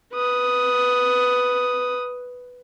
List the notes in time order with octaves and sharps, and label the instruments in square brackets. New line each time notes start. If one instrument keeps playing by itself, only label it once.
[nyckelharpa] B4 D#6